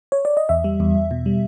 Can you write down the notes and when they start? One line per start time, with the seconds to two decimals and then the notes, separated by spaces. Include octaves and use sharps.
0.12 C#5
0.25 D5
0.37 D#5
0.49 E2 E5
0.64 G3
0.80 E2
0.96 E2
1.11 B2
1.26 G3